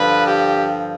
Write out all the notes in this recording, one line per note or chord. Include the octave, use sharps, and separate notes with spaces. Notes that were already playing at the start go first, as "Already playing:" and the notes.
Already playing: G2 D3 F3 B4
G4